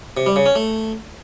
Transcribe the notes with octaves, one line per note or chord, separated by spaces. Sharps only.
C3
G3
C#3
C#4
A3